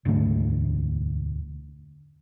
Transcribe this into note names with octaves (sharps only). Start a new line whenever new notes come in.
E1 D2 G#2 A3